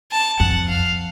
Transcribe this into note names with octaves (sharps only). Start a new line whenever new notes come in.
A5
F2 F#5
F5